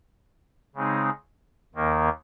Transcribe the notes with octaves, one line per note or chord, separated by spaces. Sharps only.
C#3 G#3 C4 D#4
D#2 D#3 A#3